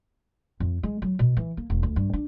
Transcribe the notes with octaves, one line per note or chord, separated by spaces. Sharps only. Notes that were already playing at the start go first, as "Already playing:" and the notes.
F2
G#3
F#3
B2
E3
A#3
E1
D2
G2
D4